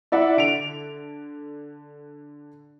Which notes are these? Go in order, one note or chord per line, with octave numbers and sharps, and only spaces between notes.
E4 D5 E5 F#5
D3 D7 F7